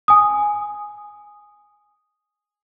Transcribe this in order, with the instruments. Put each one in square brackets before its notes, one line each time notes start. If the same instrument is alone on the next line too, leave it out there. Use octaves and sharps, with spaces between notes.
[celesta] G#5 D#6